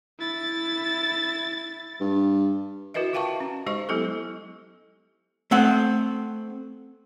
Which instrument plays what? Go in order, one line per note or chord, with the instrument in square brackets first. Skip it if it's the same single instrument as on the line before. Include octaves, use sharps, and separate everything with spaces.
[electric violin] E4 A6
[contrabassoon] G2
[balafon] E4 F#4 A#4 B4 D#5 E5
F4 E5 F5 G5 A5 C#6
C#4
G#3 D#4 G4 C5 D#5 C#6
F#3 B3 E4 G4 A4
[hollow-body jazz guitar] A3 C4 F#5